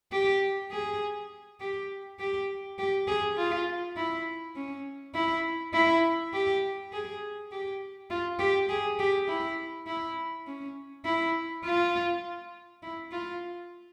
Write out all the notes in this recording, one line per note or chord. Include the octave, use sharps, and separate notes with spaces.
G4
G#4
G4
G4
G4
G#4
F4
E4
C#4
E4
E4
G4
G#4
G4
F4
G4
G#4
G4
E4
E4
C#4
E4
F4
E4
F4